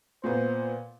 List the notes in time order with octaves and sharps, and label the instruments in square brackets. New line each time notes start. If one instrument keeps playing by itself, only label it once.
[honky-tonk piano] A#2 B3 [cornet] C5